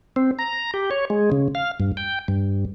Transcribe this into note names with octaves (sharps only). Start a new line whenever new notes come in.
C4
A#5
G4
C#5
G#3
C#3
F5
G2
G5
G2